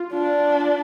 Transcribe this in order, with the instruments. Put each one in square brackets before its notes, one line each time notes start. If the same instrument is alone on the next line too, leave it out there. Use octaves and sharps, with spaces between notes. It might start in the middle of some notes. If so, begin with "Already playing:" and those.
Already playing: [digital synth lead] F4
[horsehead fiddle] D4